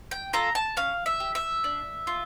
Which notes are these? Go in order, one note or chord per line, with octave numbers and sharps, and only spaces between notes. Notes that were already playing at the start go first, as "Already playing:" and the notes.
G5
F4 A4 A#5
A5
C#4 F5
E5
G4
E5
D4
F4